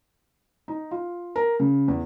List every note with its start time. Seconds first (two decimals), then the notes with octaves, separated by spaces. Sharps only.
0.68 D#4
0.91 F4
1.36 A#4
1.60 C#3
1.88 E2